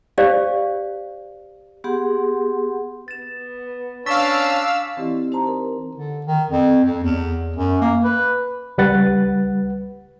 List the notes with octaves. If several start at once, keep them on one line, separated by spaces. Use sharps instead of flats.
G4 C5 D5 F5
B3 G4 G#4 F#5 C6
B3 A6 E7
C#4 D4 F5 C#6 E6 A6 B6
E3 C4 E4 G4 D5 D#5
D#4 G4 C5 A5 A#5 C6
A#4
D3
D#3
F2
F2
E2
F#2
A#3
B4
C#2 G3 B4 F#5 A6